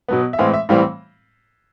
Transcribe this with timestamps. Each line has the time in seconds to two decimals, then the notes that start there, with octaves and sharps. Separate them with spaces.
0.08 B2 F#3 B3
0.33 E5
0.39 A2 E3 G#3 C4 F5
0.54 E5
0.69 A2 E3 G3 C4 F5